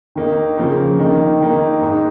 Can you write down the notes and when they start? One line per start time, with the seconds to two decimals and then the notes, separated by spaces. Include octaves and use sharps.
0.15 D#3 A#3 D#4
0.57 C#3 F3 A#3
0.99 D#3 A#3 D#4
1.40 D#3 A#3 D#4
1.81 G#2 G#3 D#4